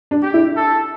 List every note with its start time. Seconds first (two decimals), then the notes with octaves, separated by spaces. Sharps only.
0.11 D4
0.22 G4
0.34 E4
0.56 A4